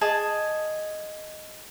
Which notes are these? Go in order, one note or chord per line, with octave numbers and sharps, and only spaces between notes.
G#4 D#5 A5